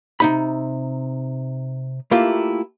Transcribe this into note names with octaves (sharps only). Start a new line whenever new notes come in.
C3 D#4 B5
A3 A#3 E4 F4 G4